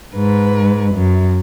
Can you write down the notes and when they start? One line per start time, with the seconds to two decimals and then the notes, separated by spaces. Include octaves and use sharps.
0.15 G#2 B4
0.94 F#2